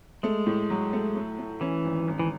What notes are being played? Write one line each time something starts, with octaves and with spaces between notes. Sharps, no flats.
G#3 A3
A2
F#3
A3
A3
A3
E3 C#4
G#1
G#1
E3